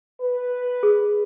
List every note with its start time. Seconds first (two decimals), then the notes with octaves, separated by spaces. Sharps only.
0.21 B4
0.83 G#4